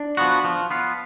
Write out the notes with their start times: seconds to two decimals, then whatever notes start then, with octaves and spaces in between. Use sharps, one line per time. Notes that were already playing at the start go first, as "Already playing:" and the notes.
Already playing: D4
0.17 F3 B3 F#4
0.44 F3
0.71 B3 F4